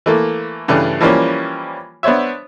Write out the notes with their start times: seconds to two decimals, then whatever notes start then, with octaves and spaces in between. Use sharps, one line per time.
0.06 E3 A3 A#3
0.68 G2 C#3 E3 A3 D4
1.01 E3 F3 G3 A#3 C#4
2.03 B3 D4 C5 C#5 E5